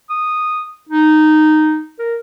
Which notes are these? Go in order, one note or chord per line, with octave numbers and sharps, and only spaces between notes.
D#6
D#4
A#4